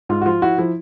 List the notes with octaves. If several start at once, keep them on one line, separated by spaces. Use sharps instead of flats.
G#2 F4
F#4
F3 F4
F3 E4 F#4
F3 E4